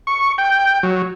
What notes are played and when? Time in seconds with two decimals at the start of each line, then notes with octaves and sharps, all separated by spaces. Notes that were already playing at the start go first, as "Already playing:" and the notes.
0.07 C#6
0.38 G5
0.83 F#3